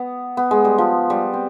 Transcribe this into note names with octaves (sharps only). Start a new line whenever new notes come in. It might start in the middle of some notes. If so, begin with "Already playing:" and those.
Already playing: B3
B3
G#3
G3
F3
G3
C4